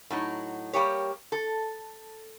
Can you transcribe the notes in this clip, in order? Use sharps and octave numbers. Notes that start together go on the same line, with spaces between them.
A2 F#3 D#4
G3 A#3 G4 C#5
A4